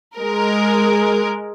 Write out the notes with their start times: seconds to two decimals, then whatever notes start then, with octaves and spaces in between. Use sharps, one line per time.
0.17 G#3 A#4